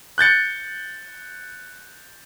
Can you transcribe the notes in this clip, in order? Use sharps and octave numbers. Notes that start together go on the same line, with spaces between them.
F#6 G6 A6 C#7